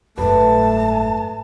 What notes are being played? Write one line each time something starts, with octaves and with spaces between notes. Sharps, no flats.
F#1 G#2 A3 B4 A5